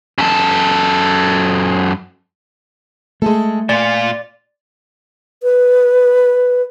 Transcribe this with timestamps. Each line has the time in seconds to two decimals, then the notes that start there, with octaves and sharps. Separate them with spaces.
0.18 F#2 A4
3.22 G#3 A3 G#4 A4
3.69 A#2 F4 D5 G#5
5.43 B4